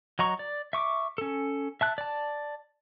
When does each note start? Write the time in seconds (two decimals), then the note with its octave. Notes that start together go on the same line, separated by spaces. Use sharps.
0.19 F#3 D#5 A#5 C#6
0.39 D5
0.73 E5 C#6 D6
1.18 C#4 A4
1.81 E5 A5 F#6
1.98 D5 A5